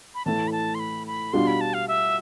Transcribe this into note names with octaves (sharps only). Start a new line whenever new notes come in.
B5
A2 E3 A3 A5
B5
A5
C6
B5
B5
B2 G3 D4 F4 C6
B5
A5
F5
E5